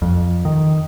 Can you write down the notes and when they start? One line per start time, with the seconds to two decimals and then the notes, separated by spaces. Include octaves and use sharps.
0.02 F2
0.45 D#3